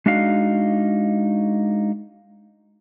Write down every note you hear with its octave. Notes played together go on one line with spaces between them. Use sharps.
G#3 D4 D#4 F#4 F5